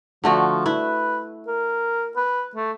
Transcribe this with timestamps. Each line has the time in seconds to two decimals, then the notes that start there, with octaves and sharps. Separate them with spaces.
0.24 D3 F3 A3 F#4
0.66 E4 B4
1.47 A#4
2.16 B4
2.56 A3